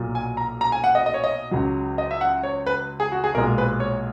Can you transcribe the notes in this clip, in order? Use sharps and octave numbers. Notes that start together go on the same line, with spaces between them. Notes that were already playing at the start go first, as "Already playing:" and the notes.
Already playing: B1 A#2 F#3
G#5
A#5
A#5
G#5
F#5
D#5
D#5
C#5
D#5
C#2 C#3 F#3
D#5
E5
F#5
C#5
B4
G#4
F#4
G#4
B1 A#2 G#3 A#4
B4
C#5